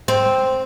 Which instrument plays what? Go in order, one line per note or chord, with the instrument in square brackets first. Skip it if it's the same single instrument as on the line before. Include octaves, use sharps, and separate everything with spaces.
[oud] C4